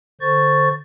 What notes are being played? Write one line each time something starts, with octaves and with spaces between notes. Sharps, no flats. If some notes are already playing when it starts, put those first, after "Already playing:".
D3 C5 C#6 A6